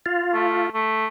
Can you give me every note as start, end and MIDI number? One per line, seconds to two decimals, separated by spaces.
0.06 0.69 65
0.33 0.67 57
0.74 1.06 57